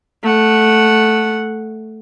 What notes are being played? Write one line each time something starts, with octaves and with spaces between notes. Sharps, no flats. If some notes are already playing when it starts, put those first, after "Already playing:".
A3 F#5